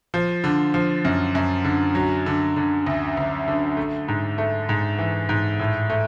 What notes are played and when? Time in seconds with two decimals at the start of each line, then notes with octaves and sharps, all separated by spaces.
0.14 F3
0.44 D3
0.74 F3
1.05 F#2
1.35 F#2
1.64 D3
1.95 F#3
2.26 D3
2.56 D3
2.86 D2
3.17 D2
3.48 D3
3.77 A3
4.08 G#2
4.38 A3
4.69 G#2
4.99 E3
5.29 G#2
5.59 A2
5.90 A3